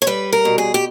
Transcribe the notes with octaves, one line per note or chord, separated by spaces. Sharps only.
C#5
G3 B4
A#4
B2
G#4
G4